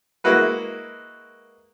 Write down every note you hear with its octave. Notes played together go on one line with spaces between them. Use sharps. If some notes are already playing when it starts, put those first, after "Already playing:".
G#3 A#3 E4 F#4 B4